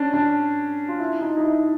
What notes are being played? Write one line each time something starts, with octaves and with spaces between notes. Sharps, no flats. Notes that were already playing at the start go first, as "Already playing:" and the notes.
Already playing: C#4 D4
D4
F4
E4
D#4
D#4
E4